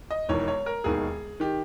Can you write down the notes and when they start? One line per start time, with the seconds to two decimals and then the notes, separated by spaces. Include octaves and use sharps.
0.11 D#5
0.29 E1 E2 D#3 C#5
0.48 C#5
0.66 A#4
0.84 E1 D#2 D#3 G#4
1.40 D#3 G4